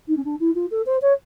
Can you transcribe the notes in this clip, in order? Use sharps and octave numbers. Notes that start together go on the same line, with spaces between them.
D#4
C#4
D4
E4
F4
A4
C5
C#5